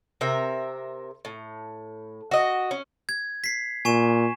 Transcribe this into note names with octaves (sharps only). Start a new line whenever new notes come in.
C3 A#4 E5
A2
F#4 D#5
C#4
G#6
B6 C7
A#2 G#5 C#6 E7